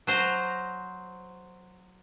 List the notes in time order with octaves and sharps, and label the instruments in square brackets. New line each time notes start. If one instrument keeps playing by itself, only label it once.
[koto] F#3 C5 A#5